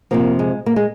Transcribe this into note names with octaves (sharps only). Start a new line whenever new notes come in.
F2 C3 F3 A#3
G#3
A#3
G#3